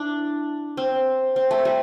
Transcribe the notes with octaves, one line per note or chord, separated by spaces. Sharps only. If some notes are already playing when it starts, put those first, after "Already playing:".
Already playing: D4 E4
C4
C4
A3
G3